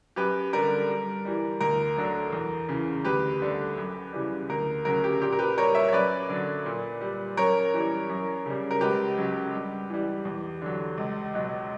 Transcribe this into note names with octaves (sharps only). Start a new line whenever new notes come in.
F#2 G4 B4
D3 G3 A#4
G2
E3 G3
D2 A#4
D3 F#3
E2
C#3 E3
D2 G4 B4
D3 G3
F#2
C#3 E3 G3
D2 A#4
C#3 F#3 A#4
G4
A#2 G4
A#4
G4 B4
G3 A#4 C#5
C#5 E5
C#5
F#2 B4 D5
D3 F#3
A#2
G3
F#2 A#4 C#5
E3 G3
F#2
C#3 G3
A#4
C#2 G4 B4
C#3 F#3
G2
E3 G3
E2
D3 F#3
C#2
B2 F#3